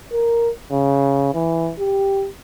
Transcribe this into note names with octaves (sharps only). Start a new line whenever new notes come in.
A#4
C#3
E3
G4